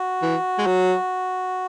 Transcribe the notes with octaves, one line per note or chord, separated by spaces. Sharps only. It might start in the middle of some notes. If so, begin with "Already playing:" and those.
Already playing: F#4
E3
G#3
F#3